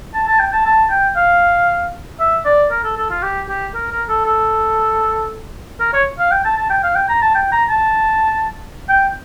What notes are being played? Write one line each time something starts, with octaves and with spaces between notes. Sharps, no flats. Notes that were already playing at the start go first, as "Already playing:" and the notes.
A5
A5
G5
A5
A5
G5
F5
E5
D5
A#4
A4
A4
F4
G4
G4
A#4
A#4
A4
A4
A#4
C#5
F5
G5
A5
A5
G5
F5
G5
A#5
A5
G5
A#5
A5
G5